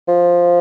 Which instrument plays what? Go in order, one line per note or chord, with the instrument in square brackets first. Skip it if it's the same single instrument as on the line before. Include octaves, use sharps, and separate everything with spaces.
[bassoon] F3